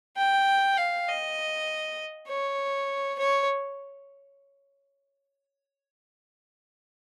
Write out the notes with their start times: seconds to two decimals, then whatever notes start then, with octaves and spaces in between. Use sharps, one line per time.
0.17 G5
0.77 F5
1.08 D#5
2.28 C#5
3.19 C#5